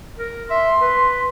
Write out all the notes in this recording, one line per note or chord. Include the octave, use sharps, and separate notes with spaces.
A#4
E5 C6
B4